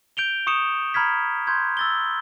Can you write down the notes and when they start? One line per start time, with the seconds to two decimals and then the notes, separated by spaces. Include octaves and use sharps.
0.17 G6 D7 F7 G7
0.47 C#6 D#6 C#7 E7 F7
0.94 A#5 B5 F6 G#6 B6
1.47 C6 G6 G#6
1.77 E6 A6 G7